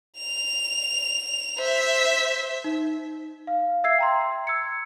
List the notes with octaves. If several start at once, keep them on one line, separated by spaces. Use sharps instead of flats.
F7
C5 E5
D#4
F5
E5 E6 G#6 C7
G5 A#5 C6
E6 G#6 C#7